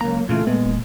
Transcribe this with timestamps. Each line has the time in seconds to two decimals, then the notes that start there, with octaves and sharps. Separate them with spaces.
0.01 C#2 F#3 A#3 A#5
0.29 A#2 C#3 E3 A3 F4
0.47 A#2 G#3 B3
0.66 E1